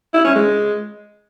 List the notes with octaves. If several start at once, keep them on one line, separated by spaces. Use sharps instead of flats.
E4
C#4
G#3